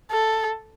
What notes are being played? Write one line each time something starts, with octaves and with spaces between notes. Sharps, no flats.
A4